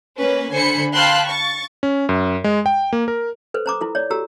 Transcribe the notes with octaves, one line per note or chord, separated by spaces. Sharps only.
A#3 C#4 B4
D3 C5 G#5 B5 C#7
F5 G5 A5 B5 C6 F#6
C#6 A6
C#4
F#2
G#3
G5
A#3
A#4
A4 B4 C5
C5 A#5 D6 D#6
E4 F4 A4
C#5 D5
F#4 G4 A4 A#5 E6